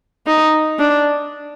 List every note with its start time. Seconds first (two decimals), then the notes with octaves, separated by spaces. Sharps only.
0.27 D#4
0.79 D4